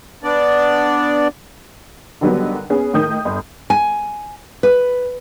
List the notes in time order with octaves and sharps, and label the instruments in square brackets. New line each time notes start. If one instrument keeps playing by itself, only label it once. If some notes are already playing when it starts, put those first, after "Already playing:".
[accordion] B3 D4 D5
[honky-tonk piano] D3 D#3 F#3 G3 B3
B3 C#4 G#4
A2 D#3 D#6 G6
G1
[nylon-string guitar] G#5
B4